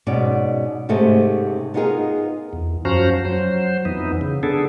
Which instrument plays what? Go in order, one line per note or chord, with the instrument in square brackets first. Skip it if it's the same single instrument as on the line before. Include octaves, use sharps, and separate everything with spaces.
[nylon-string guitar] G#2 B2 C#4 D5
G#2 C3 A3 C#4 G#4
B3 D#4 F4 F#4 G#4 A#4
[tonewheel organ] E2
F#2 F3 C#4 F#4 C5 A#5
F#3 C5
F2 E3 B3 D#4
C#3
B3 D4 G#4 A4